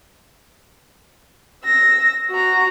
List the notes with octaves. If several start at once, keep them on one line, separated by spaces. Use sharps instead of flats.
E6 A#6
F#4 A#5